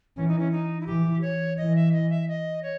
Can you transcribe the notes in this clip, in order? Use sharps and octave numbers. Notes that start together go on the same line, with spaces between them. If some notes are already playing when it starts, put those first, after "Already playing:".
E3 C#4
D#4
C#4
D#4
E4
E3 G4
C#5
E3 D#5
E5
D#5
E5
D#5
C#5